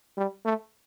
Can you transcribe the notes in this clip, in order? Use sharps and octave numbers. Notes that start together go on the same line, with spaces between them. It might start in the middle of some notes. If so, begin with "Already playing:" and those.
G3
A3